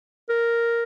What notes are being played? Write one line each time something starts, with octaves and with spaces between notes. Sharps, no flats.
A#4